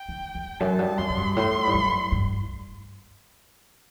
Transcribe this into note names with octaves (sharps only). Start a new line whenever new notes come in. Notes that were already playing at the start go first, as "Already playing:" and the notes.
Already playing: G5
D#3
E2
F#2 A5
G2
F#2 C6
A2
G2
A2 C6
G2
F#2
G2